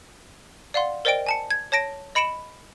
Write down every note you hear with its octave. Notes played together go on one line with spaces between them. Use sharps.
D5 F5 F#5 C6
A#4 C5 D5 D#5 G5 D7
G#5 A5 C#7
G#6
C#5 A5 A#6 D7
D#5 B5 C#7 D7 E7 F#7